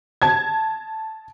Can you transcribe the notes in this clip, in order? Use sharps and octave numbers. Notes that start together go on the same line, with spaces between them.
A5 G#6